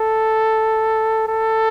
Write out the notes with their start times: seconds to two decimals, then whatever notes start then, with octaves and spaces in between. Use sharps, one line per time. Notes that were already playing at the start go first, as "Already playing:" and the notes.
Already playing: A4
1.27 A4